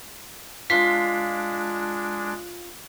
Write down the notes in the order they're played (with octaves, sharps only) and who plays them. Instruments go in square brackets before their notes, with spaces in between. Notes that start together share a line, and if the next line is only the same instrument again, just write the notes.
[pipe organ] G#3 D4 [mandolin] F4 [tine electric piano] B6